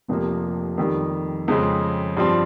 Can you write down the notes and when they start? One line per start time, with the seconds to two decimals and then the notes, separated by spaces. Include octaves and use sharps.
0.08 F1 F2 C3 F3 A#3
0.78 F2 D#3 G3
1.48 F2 C#3 G#3 C4
2.17 G2 F3 C4